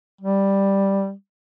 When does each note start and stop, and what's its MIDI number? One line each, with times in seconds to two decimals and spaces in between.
0.21 1.13 55